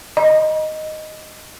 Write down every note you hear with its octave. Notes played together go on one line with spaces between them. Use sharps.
D#5